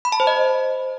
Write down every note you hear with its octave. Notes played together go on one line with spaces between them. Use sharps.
B5
A5
C5
D#5